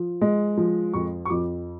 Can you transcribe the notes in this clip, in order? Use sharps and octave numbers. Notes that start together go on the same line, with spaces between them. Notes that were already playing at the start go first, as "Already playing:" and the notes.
Already playing: F3
G#3
F3
F2 C#6
C#6
F2 D6